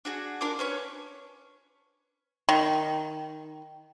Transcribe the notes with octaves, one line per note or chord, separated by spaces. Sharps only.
D4 F#4 G#4
D4 F4 A#4 D6
C#4 B4 C#5
D#3